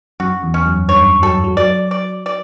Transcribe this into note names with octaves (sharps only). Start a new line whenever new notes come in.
F#2 F#4
E2
C#4
F#2
G2 C#5
F#3 A4
F#3
F#3 D5
D5
D5